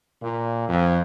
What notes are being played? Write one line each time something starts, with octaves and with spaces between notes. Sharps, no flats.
A#2
F2